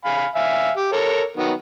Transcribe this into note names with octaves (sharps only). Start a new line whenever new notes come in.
F5 G#5 B5
E5 F5 G#5
G4
A4 A#4 C#5
D#3 F#3 B3